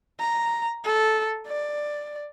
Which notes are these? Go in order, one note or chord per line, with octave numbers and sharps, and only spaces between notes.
A#5
A4
D5